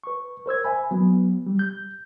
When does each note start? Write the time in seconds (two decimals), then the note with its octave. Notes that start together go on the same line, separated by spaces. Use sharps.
0.04 B4 C#6
0.46 A#4 C5 E6 G#6
0.64 E5 G#5 B5
0.91 F#3 B3
1.46 G3
1.59 G6